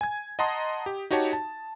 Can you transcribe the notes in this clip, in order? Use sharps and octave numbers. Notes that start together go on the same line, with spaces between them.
G#5 G#6
D#5 F#5 A5 A#5 C6 D#6
G4
D#4 F#4 G4 C#5 A5
A5